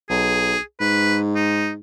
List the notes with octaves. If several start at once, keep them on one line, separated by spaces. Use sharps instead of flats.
B1 G#4
G#2 B4
D#4